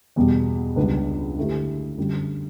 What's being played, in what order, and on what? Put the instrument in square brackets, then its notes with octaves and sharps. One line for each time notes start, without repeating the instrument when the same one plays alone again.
[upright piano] E2 B2 G3
C#2 C#3 G3 B3 D4
D3 A3 E4 G4
F#2 D3 G3